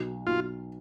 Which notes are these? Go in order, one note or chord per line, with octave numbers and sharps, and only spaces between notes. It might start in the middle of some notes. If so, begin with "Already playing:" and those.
Already playing: B1
B1 F4